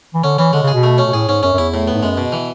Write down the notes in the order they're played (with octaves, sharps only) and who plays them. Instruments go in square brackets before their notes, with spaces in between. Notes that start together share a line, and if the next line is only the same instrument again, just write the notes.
[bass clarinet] E3
[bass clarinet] D3 [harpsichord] C#4
[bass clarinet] E3 [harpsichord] C#4
[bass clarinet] D3 [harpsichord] G#3
[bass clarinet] C#3
[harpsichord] G#4
[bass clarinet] B2
[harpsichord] A3
C#4
[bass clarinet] B2
[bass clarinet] A2 [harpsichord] G#4
[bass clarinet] G#2 [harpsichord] C#4
[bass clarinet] F#2 [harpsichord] C#4
[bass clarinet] F#2
[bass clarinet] E2 [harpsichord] E4
[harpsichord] A2
B3
[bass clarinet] G#2
[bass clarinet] F#2 [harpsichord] G#3
[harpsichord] B2
E3